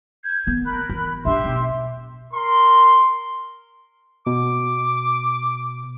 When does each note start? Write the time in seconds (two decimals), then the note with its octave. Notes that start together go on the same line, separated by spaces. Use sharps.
0.24 G6 G#6
0.47 D#3 B3
0.65 A#4 B5 F#6
0.90 E3
1.25 G2 D4 G4 E5 C6
1.45 B1
2.34 A#4 C6
4.27 B2 D6